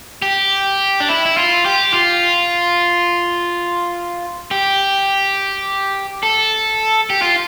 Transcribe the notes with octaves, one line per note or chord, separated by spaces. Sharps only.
G4
D4
E4
E4
F4
G4
F4
G4
A4
G4
F4